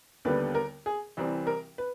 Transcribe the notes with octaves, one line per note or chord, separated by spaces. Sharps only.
D#2 D3 G3 B3 B4
A#4
G#4
C2 C3 E3 G3 C4
A#4
B4